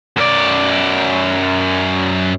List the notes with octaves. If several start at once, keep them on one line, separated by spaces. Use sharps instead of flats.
F#2 D5